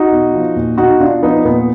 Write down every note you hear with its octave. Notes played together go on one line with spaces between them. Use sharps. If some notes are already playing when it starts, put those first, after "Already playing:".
Already playing: D#4 F#4
B2
F3
A#2
B2 D#4 F#4
B2 D4 F4
F3 B3 D#4
A#2 B3